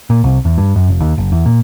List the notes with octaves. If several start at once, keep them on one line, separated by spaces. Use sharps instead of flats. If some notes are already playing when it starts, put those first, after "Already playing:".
A#2
C2
E2
G2
F#2
F1
D#2
F#1
E2
A#2